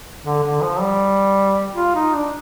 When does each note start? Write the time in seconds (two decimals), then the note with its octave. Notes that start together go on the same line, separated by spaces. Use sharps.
0.25 D3
0.43 D3
0.62 F3
0.81 G3
1.75 F4
1.95 D#4
2.14 D4